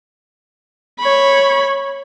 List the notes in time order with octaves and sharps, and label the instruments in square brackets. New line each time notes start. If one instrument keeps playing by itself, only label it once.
[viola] C#5 B5